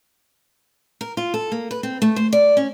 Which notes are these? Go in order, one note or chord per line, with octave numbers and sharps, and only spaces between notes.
A#4
F4
A4
A#3
B4
C4
A3
C5
D5
C#4